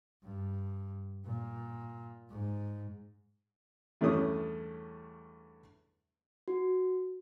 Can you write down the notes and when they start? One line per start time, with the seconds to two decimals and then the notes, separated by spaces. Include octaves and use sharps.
0.23 G2
1.25 A#2
2.30 G#2
4.01 E2 G2 A3 C#4 D#6
6.48 F#4